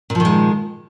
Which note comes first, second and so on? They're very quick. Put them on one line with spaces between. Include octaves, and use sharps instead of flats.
A#2 F3 D#3 G#3